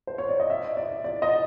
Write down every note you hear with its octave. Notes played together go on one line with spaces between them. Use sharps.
C5
C#5
D5
D#5
E5
D5
D5
D#5